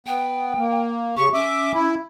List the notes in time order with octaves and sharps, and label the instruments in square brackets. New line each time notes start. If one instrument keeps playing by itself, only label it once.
[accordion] B3 [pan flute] G5
[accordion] A#3
[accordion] C#3 C#6 [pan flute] G4
[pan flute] C#4 [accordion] E5 D6
[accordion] E4